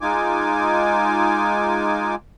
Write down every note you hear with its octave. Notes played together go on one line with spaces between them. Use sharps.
G#3 D#4 F4 G#5 D6